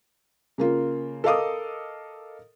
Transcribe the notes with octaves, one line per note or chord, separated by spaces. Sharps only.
C#3 A#3 F4
A4 A#4 D#5 F5 D6 D#6